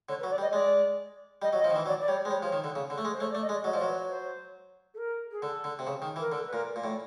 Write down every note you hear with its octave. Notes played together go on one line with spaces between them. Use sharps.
D3 C#5
B4
F#3
D5
G3
D#5
G#3 D5
G3 D#5
F#3
D#5
F3
D#3
E3
F#3 D5
D5
G3 C#5
G#3 C5
G3 C#5
F3
D#3
D3
C#3
D3
A3
G#3
C5
A3 C#5
D5
A3
D#5
G#3
D5
F#3 D#5
F3 D5
F#3
B4
C#5
C5
A4
A#4
G#4
D3 A4
D3
C3
C#3
D#3
E3
A#4
D3 A4
B4
A#2 A#4
A#2
A2